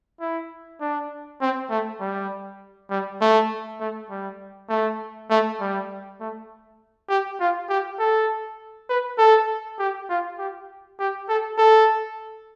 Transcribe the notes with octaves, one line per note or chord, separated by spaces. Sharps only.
E4
D4
C4
A3
G3
G3
A3
A3
G3
A3
A3
G3
A3
G4
F4
G4
A4
B4
A4
G4
F4
G4
G4
A4
A4